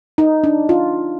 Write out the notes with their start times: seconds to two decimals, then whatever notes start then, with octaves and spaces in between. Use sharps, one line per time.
0.18 D#4
0.44 D4
0.69 F4